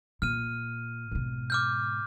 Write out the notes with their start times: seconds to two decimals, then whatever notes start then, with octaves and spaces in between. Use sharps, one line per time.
0.22 A#2 F6 D#7
1.11 G#2 B2
1.50 D6 F6 G6